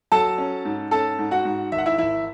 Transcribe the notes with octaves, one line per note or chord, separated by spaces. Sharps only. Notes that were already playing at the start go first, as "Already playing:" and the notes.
F#3 A4 A5
C#4
G#2
C#4 A4 A5
G#2
F#4 F#5
G#2
G#1 E5
F#5
E4 E5
G#1 E4 E5